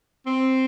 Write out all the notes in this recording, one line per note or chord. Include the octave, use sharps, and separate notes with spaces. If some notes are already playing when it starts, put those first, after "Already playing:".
C4